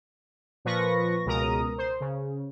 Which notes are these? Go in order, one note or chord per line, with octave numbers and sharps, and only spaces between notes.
A#2 F3 B4 C#6 A#6
C#2 B2 A#4 A#5 D#6
C5
C#3